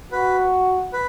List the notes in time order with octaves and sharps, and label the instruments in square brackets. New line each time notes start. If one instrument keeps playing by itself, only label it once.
[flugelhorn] F#4 [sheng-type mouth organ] B4
[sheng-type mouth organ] B4